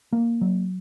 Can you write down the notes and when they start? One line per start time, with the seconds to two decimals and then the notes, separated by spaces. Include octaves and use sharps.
0.13 A#3
0.41 F#3